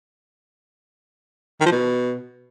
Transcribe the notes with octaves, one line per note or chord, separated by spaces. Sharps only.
D#3
F3
B2